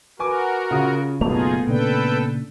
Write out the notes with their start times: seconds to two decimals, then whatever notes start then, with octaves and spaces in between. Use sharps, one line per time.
0.19 F#4 A#4 B4 G#5 D6
0.71 C#3 F4 D#6
1.21 F#1 B2 A3 B3 D#4 F4 G#4 F7
1.67 A#2 C#3 D4 A4 B4 G5